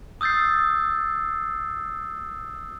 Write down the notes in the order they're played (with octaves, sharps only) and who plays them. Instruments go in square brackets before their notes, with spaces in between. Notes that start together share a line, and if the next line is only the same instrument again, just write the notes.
[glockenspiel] D#6 E6 G6 A6 C7